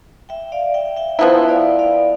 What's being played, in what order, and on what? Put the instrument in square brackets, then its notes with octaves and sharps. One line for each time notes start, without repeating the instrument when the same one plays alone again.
[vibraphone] E5 G5
D5 F5
E5 G5
E5 G5
[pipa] F3 B3 E4 [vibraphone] E5 G5
[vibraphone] D5 F5
D5 F5